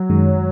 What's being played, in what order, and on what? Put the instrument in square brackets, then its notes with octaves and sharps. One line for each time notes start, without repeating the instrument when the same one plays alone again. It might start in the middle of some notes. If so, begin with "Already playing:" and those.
Already playing: [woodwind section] F#3
[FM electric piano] F#2 D#3 G#3